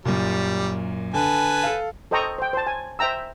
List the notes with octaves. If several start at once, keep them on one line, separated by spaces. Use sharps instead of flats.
F#2 A#2 G3
D3 B4 G#5 A5
A4 F5
A4 C5 D#5 G5 A#5 C#6
C5 G5
C5 A5
G#5
C5 E5 G5 A#5 E6